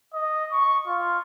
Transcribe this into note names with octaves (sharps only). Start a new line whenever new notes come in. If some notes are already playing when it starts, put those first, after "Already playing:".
D#5
C#6
F4